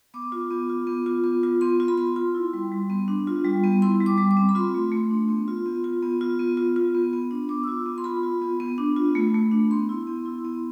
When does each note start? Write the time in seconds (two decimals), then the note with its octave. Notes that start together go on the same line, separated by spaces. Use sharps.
0.14 B3 D6
0.32 F4
0.51 B3
0.70 F4
0.87 B3
1.06 F4
1.24 B3
1.43 F4
1.61 B3 C6
1.80 F4
1.88 B5
1.98 B3 C6
2.16 F4
2.34 E4
2.53 G3
2.72 G3
2.90 B3
3.08 D4
3.27 F4
3.44 G3
3.64 B3
3.82 E4 C6
4.00 G3
4.06 D6
4.18 G3
4.31 D6
4.37 C4
4.49 B5
4.55 F4 C6
4.74 A3
4.92 A3
5.10 D4
5.28 B3
5.48 F4
5.66 B3
5.84 F4
6.03 B3
6.21 F4
6.39 B3
6.57 F4
6.76 F4
6.95 B3
7.13 B3
7.31 D4
7.49 B3 D6
7.64 E6
7.67 F4 D6
7.86 B3
7.98 C6
8.04 F4 B5
8.23 F4
8.41 B3
8.60 B3
8.78 D4
8.96 F4
9.15 A3
9.34 A3
9.52 D4
9.70 B3 C6
9.89 E4
10.07 B3
10.26 E4
10.45 B3